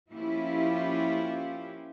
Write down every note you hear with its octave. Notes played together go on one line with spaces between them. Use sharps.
F3 A#3 C#4 E4 F4 G4